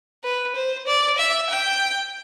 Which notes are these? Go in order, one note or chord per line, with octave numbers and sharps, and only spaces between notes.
B4
C5
D5
E5
G5